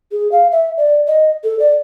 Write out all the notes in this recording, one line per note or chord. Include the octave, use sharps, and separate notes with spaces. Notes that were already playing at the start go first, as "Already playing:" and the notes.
G#4
F5
E5
D5
D#5
A4
D5